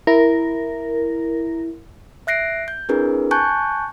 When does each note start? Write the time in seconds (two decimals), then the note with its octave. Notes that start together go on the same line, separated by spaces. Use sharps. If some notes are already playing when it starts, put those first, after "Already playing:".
0.07 E4 A#4
2.27 E5 F#6 A#6 C7 D7
2.68 G6
2.89 C4 D4 E4 G#4 A#4 B4
3.31 G#5 A5 C#6 F#6 G6